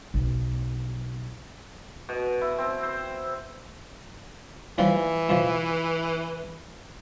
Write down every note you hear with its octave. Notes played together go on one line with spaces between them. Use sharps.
B1
B2
E4
C4
C5
D#2 E3 F3 G3
F2 B2 F3